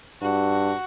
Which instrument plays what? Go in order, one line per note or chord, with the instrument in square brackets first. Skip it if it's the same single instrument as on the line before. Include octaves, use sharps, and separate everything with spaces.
[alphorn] G2 [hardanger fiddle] F#4